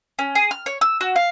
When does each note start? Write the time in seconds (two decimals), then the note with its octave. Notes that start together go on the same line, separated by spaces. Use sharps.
0.19 C#4
0.35 G#4
0.51 F6
0.66 C#5
0.81 E6
1.01 F#4
1.16 F5